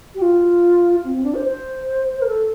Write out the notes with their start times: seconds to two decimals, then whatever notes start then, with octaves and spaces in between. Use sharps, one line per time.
0.14 G4
0.21 F4
1.03 C4
1.14 C4
1.23 D4
1.34 C5
1.45 C5
2.21 A#4
2.26 A4